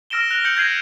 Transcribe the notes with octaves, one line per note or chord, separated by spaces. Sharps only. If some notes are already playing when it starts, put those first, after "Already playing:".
E6 F6 A#6 D7 E7 G7
F#6 A#6 F7
G6 C#7 F#7
G6 G#6 A#6 C7 D#7 F#7